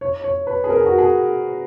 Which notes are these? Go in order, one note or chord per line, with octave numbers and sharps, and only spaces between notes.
C#5
C#5
B4
G#4
A#4
G#4
F#4
G#4